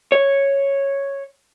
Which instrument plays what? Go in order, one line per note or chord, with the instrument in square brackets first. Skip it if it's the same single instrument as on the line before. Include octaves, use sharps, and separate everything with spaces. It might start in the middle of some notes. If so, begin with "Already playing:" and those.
[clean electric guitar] C#5